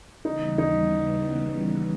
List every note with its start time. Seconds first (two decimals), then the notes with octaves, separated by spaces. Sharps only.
0.24 D#2 C#3 E3 G3 B3 D#4
0.58 D#4